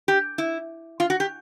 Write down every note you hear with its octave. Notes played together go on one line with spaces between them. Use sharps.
G4
E4
F4
F#4
G4